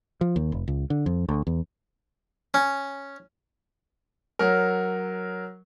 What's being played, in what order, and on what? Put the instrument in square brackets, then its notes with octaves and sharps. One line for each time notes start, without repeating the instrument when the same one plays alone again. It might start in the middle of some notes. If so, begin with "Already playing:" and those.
[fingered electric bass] F3
D#2
F1
C#2
D3
F2
D2
E2
[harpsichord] C#4
[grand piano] F#3 A#4